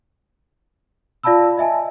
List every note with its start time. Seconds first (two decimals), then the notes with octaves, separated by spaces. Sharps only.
1.23 F4 D5 F5 A5 B5 E6
1.58 D#5 E5 G#5 A5